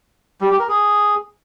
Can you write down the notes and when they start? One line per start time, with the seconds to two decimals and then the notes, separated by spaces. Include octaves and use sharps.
0.41 G3
0.50 G4
0.59 A#4
0.68 G#4